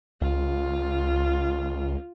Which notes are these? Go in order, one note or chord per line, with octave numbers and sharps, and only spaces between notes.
C#2 F4